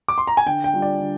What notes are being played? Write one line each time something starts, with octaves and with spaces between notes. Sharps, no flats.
D6
C6
A#5
G#5
D3 G5
G5
G3 D4 F4
D5
D3